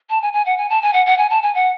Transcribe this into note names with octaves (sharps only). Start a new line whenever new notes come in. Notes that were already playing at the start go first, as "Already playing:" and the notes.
A5
G#5
G#5
F#5
G#5
A5
G#5
F#5
F#5
G#5
A5
G#5
F#5